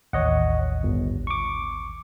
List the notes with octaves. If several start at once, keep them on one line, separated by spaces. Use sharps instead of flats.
A1 D#2 C#5 D#5 F#5
G1
C#6 D6